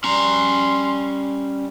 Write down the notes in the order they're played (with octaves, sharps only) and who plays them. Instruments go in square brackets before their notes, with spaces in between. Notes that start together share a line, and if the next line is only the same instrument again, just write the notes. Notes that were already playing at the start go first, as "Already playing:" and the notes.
[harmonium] G3 [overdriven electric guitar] C#4 A#5 [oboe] C6